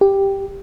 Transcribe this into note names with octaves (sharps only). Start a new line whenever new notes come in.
G4